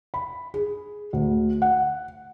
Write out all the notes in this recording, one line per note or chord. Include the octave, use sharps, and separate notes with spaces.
B5
G#4
D2
F#5